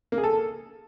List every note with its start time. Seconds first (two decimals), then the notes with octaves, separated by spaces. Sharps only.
0.12 A#3
0.18 G#4
0.24 A4